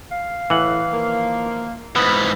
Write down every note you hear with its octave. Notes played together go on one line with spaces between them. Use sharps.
F5
A2 E3 F#5
D#3 F3 A#3
G#2 E3 B3 B5